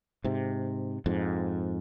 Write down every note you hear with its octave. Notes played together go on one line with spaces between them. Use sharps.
G#2 C3
F2 G#2